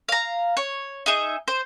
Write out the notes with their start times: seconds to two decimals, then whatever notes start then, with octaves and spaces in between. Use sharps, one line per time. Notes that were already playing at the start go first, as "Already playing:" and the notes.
0.09 F5 A#5
0.57 C#5
1.06 D#4 G#4 E5
1.48 C5